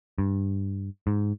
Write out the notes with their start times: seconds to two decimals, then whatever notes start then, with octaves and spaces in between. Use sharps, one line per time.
0.18 G2
1.07 G#2